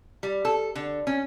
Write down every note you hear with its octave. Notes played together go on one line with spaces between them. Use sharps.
G3
A4
D3
C#4